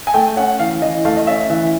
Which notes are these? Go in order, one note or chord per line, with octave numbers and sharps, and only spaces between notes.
G#5
A3 G5
C#4 F#5
E3 F5
E3 D#5
A3 F5
D#5
C#4 E5
E3 E5